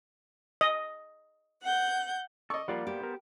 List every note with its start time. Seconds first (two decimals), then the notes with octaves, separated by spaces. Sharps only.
0.61 D#5
1.62 F#5 G6
2.50 A4 D5 D#5 C#6
2.68 F3 G3 A#3 F4 G4 D5 F#5
2.87 B3 G4 C5
3.03 A#4